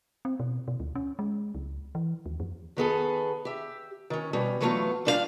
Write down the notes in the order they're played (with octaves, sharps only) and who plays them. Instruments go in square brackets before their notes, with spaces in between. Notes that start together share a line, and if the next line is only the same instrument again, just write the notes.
[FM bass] C4
B2
B2
D2
C#4
G#3
C#2
E3
D#2
F2
[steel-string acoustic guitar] D#3 B3 G#4 A4
G4 E5
D#3 C#4
B2 G3 C#4
E3 F#3 A3 B3 D#4 F4
A#2 G3 D4 F4 A4 F5